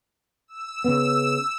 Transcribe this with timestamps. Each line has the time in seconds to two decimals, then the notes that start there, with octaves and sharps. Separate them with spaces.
0.48 E6
0.84 C#3 B3